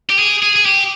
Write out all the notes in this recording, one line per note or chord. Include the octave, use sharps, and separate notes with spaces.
G4
G#4
G#4
G#4
G4